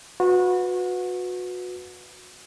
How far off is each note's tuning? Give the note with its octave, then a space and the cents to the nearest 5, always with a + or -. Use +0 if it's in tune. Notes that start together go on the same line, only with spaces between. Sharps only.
F#4 -30 B4 +5